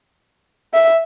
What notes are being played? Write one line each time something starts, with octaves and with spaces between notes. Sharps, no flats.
E5